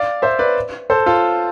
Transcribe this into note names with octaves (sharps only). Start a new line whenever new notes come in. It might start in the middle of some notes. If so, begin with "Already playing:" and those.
Already playing: D5 F5
C5 E5
B4 D5
A4 C5
F4 A4